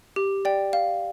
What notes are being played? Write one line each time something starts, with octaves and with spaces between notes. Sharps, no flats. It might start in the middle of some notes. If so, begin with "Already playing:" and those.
G4
D5 G5
F5